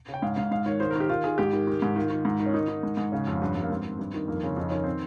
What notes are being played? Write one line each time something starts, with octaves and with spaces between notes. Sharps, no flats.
C#3
G5
G#2 F5
G#2 F5
G#2 F5
D#3 C#5
D#3 C5
D#3 A#4
G4
D#3 F4
D#3 G#4
G#2 G4
D#3
D#3
G#2
D#3 F4
D#3
G#2
D#3
C#4
D#3 D#4
D#3
G#2
G#2
C#3 C#4
F2
G2
G2
A#3
G#2 C4
D#3
G2
D#3
F2 A#3
C#3 C4
F2 D#4
D#3 C#4
C4